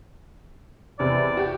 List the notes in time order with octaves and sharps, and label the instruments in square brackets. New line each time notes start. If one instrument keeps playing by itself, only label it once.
[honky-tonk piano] E2 C3 [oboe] D5
[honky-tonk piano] F#4 G4